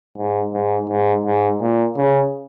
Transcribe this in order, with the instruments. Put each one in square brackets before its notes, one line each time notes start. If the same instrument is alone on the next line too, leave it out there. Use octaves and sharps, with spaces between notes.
[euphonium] G#2
G#2
G#2
G#2
A#2
C#3